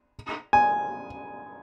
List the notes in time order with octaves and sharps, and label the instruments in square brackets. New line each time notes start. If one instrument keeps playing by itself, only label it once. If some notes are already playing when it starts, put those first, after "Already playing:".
[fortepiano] G#5